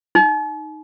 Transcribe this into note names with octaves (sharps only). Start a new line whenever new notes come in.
D#4